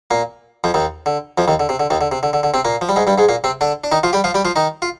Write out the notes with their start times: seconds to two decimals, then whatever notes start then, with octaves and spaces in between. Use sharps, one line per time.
0.11 A#2 A#3
0.64 F2 F3
0.74 D#2 D#3
1.06 D3
1.38 F2 F3
1.48 D#2 D#3
1.60 D3
1.69 C3
1.80 D3
1.90 D#2 D#3
2.01 D3
2.12 C3
2.23 D3
2.33 D3
2.43 D3
2.54 C3 C4
2.65 A#2 A#3
2.81 F3
2.89 G3
2.96 G#2 G#3
3.07 G2 G3
3.18 G#2 G#3
3.29 A#2 A#3
3.44 C3 C4
3.61 D3 D4
3.84 D4
3.92 D#3 D#4
4.03 F3 F4
4.13 G3 G4
4.24 F3 F4
4.34 G3 G4
4.45 F3 F4
4.56 D#3 D#4
4.82 F4